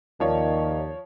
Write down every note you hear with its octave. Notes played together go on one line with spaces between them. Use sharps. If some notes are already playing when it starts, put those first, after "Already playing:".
D#2 D#3 F3 C#5 D5 F5 A5